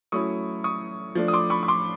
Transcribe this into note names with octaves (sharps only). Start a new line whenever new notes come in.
F#3 A3 C#4 E4 C#6 D#6
C#6 D#6
F3 A3 D4
D#6
C6 D6
B5 C#6
C#6
C6 D6